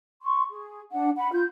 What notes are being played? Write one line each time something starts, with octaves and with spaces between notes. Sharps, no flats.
C6 C#6
G#4
D4 F#5
F#5 B5
F4 G6